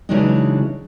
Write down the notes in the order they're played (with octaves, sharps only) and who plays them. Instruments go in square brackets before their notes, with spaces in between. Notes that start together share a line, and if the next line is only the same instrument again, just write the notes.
[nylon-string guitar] C#3 E3 F#3 G#3 D4 D#4